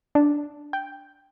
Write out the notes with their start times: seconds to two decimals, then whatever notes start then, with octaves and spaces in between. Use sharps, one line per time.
0.15 D4
0.73 G5